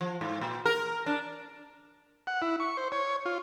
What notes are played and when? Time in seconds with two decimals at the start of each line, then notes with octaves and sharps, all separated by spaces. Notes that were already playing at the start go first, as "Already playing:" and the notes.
0.01 F3
0.21 G#2
0.41 A#2
0.65 A#4
1.06 D4
2.27 F#5
2.42 E4
2.60 C#6
2.77 C5
2.92 C#5
3.26 F4